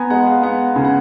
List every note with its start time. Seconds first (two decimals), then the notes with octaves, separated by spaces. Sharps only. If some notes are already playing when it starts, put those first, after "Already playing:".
Already playing: B3 G#5 A#5
0.10 G#3 F#5
0.27 F5
0.43 B3 F#5
0.76 C#3 G#5
0.85 F#5